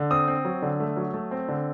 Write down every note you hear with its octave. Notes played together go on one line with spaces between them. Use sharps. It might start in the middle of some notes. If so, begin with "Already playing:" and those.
Already playing: D3
C4 D#6
C4
F#3
D3
A3
F#3
A3
C4
D3